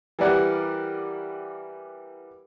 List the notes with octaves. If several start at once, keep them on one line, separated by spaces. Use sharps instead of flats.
E3 G3 A#4 D5 F#5